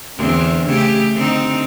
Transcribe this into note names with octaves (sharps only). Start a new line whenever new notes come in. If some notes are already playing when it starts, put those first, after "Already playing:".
E2 D3 C4
C#3 A3 G4
D3 C4 D#4